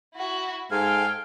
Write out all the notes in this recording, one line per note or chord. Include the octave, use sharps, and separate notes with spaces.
E4 F#4
G#2 A4 F5 G5 G#5 F6